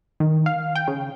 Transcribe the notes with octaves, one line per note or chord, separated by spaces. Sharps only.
D#3
F5
G5
C#3